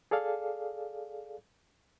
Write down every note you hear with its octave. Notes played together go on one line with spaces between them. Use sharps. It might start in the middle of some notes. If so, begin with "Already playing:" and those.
G#4 A4 D5 F5